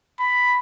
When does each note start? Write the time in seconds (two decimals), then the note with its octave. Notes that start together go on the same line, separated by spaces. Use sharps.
0.20 B5